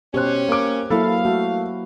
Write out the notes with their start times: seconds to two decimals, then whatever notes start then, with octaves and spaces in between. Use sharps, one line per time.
0.14 B2 C#4 G4 C5 F#6
0.48 A#3 D6
0.90 F#3 A#3 E4 A4 F5 B5
1.25 A3 F#4